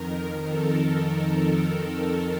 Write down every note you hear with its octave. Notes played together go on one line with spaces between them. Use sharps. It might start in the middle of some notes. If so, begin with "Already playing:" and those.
Already playing: F2 D#3 A#4
A4